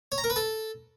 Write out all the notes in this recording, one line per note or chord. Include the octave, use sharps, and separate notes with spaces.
C#5
A#5
A#4
B4
A4